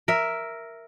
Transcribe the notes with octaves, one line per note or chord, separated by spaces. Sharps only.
A#4 E5